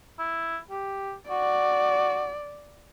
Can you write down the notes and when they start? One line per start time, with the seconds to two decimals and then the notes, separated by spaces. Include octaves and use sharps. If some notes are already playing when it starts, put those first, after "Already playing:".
0.19 E4
0.71 G4
1.30 F#4 D5